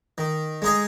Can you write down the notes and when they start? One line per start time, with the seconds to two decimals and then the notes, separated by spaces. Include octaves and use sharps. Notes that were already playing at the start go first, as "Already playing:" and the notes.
0.18 D#3
0.62 G#3 D#4 G#4 D#5